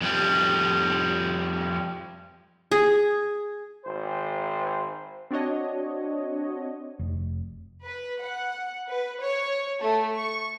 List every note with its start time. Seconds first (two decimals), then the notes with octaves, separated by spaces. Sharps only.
0.01 F2 G3
2.71 G#4
3.85 G#1 C5
5.31 C4 D4 F#4 C#5 D#5
6.99 F1
7.83 B4
8.21 F#5
8.88 B4
9.21 C#5
9.81 A3
10.16 C#6